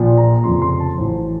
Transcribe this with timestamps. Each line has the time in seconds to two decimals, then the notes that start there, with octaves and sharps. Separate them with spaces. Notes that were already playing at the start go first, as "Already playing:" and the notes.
Already playing: A#1 A#2 F3
0.17 A#5
0.44 F1 F2 C#3 F3 C6
0.62 C6
0.80 A5
0.98 A1 A2 F#3 C5